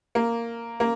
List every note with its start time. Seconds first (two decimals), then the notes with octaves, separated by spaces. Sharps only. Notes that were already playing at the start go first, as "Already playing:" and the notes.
0.15 A#3
0.80 A#3